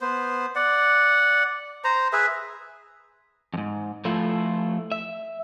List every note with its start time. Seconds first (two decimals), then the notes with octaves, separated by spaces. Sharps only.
0.01 B3 C5
0.55 D5 F#5
1.84 C5 A#5
2.13 G#4 B4 E5
3.54 F2 G#2
4.05 F3 A3 E4 F4
4.92 E5